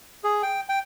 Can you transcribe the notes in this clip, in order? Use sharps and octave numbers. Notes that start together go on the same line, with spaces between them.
G#4
G5
G5